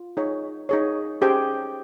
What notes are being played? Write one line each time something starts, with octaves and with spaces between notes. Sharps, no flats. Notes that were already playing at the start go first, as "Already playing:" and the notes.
Already playing: F4
D#4 G#4 C#5
D#4 G#4 C#5
C#4 G4 G#4 C5 G5